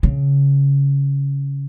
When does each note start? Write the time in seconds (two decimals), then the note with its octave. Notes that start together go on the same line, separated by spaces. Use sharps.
0.03 C#3